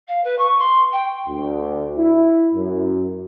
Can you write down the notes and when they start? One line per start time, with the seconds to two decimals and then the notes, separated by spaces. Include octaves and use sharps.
0.08 F5
0.24 B4
0.38 C#6
0.59 C6
0.92 G5
1.27 D2
1.98 E4
2.54 F#2